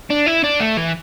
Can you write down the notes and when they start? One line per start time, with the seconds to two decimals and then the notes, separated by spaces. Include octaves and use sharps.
0.10 D4
0.26 E4
0.44 D4
0.60 A3
0.77 E3